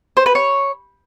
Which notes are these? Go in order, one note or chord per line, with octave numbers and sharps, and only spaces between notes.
C5
B4
C#5